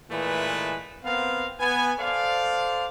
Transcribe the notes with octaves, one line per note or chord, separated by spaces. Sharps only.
A#2 E3 G#3 A3 B4
B3 C4 A#4 F5
B3 G#5
A4 C5 D5 F5